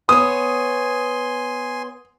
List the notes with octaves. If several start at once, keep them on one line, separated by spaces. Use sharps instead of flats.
B3 C#5 G#5 C6 D#6